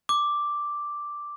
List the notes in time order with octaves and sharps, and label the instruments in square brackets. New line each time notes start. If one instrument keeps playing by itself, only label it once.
[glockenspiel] D6